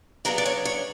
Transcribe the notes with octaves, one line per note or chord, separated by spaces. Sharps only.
C#3 F#3 B3 D4 A#4
D5
C#5
C#5